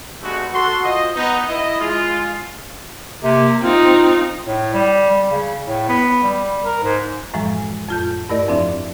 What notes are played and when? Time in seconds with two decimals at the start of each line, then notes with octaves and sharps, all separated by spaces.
0.21 G2 G#3 A3 B3 F#4
0.54 F#4 A4 C6
0.84 F4 C5 D#5
1.15 B3 D#4
1.48 E4 D#5
1.80 G#3 F4
3.23 C3 A#3
3.63 C4 D#4 F4
4.46 A2
4.74 G3
5.10 G3
5.31 C#3
5.67 A2
5.89 B3
6.23 G3
6.63 A#4
6.83 G#2
7.34 F#2 A2 E3 F3 G#3
7.89 F2 A2 F4 A5 G6
8.29 G2 A3 E4 A#4 D5 D#5
8.48 F2 F3 C4 D4 D5 E5